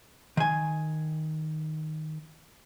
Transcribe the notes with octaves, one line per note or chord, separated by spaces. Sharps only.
D#3 G#5